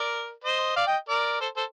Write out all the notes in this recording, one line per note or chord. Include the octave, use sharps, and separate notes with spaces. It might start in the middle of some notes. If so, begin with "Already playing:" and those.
Already playing: A#4 D5
C5 D#5
D5 F5
D#5 G5
A#4 D5
A4 C5
A4 C5